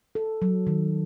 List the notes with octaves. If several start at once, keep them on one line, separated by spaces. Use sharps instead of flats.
A4
F#3
D#3